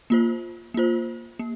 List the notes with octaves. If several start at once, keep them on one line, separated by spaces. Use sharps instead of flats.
A#3 F4 C5
A#3 F4 C5
A#3